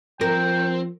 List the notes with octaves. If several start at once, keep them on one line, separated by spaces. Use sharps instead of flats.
F3 C4 A#4 G5